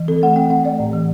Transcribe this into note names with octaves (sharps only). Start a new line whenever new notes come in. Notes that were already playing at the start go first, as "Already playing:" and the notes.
Already playing: E3
C4 A4
A3 F#5
C4 G5
C4 F#5
A3 D5
A2
E3